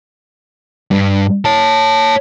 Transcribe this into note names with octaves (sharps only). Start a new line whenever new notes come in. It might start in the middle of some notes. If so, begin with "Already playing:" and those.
G2
C#5 A5